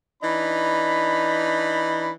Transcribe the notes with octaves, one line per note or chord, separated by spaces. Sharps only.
E3 D4 D#4 B5